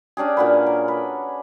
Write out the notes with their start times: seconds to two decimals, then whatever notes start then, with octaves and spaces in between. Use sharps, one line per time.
0.17 C#4 D4 G4 G#4
0.37 A#2 F#4 B4
0.66 A#4
0.88 B4